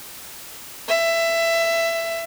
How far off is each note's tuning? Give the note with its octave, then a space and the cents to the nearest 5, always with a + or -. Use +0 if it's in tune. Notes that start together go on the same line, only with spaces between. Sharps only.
E5 +15